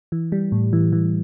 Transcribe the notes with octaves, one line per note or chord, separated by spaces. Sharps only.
E3
G3
A2
E3
E3